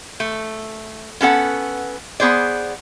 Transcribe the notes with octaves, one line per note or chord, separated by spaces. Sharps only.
A3
B3 C#4 A4 F#5
B3 G#4 C5 D5